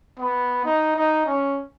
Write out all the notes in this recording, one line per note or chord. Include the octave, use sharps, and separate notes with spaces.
B3
D#4
D#4
C#4